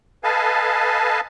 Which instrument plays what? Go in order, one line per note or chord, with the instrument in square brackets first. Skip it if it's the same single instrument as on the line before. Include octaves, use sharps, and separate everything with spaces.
[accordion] A4 B4 D#5 F5 G#5 A5